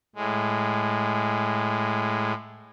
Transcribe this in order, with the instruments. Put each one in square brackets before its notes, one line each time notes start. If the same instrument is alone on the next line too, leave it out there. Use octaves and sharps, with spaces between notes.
[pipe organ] A2 G#3